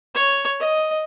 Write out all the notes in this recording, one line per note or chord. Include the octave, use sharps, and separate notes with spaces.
C#5
D#5